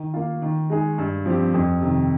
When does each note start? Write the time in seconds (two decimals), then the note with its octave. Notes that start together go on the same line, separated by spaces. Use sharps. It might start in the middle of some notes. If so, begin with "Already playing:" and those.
Already playing: D#3
0.14 A#3 F4
0.42 D#3
0.70 G#3 D#4 G#4
0.98 G2
1.26 F3 C4 G4
1.54 F2
1.81 C3 D#3